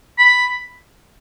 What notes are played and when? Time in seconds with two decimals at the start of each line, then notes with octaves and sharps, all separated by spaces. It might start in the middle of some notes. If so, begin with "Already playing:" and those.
0.19 B5